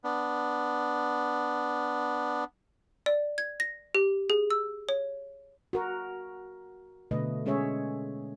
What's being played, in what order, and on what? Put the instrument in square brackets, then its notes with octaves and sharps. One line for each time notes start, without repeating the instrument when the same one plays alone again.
[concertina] B3 D4
[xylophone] D5
G#6
A#6
G4
G#4
E6
C#5
[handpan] F#4 A#4
B2 D3 A3 B4 D#5
G#3 C#4 G#4 C#5 E5